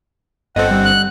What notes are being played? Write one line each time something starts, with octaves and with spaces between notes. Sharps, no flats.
G1 C4 A4 D#5 F#5
G3
F#6